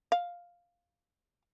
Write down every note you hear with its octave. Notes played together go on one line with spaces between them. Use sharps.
F5